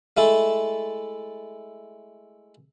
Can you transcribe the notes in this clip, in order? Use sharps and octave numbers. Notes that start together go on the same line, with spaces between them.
G#3 A3 E4 A4